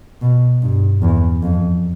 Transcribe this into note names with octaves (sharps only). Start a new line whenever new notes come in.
B2
G2
E2
F2